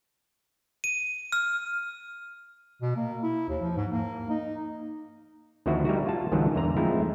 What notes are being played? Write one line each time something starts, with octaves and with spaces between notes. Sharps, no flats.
D#7
F6
B2
A#3
E4
D#2
F3
G#2
A#3
D#4
D2 D#3 F3 D4 E4 F#4
G3 D#4 E4 F#4
A#3 F4 F#4 A5
G#1 C#2 G#2 D#3 F3 F#3
E2 D3 C5 A#5
F3 G#3 A3 C4 D#4 E4